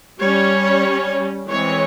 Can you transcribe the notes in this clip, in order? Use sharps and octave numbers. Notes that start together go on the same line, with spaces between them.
G3 C#4 C#5
E3 G#3 C4 C#5